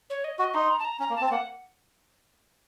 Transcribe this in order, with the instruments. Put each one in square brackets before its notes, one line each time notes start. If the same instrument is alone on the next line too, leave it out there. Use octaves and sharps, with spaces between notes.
[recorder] C#5
D#5
[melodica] F#4 [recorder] D#5
[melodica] D#4 [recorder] C6
[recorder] A#5
A5
A#5
[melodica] C#4 [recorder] A#5
[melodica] A#3
[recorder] A5
[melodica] C4
[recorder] A5
[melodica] A#3 [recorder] F#5